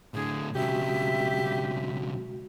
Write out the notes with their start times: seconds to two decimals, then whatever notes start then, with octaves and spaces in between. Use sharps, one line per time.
0.14 A2 D3 G#4
0.55 B1 C#3 G#3 F#4 G4 E5